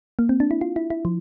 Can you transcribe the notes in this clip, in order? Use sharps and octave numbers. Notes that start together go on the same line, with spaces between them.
A#3
C4
D4
E4
F4
E4
E4
F3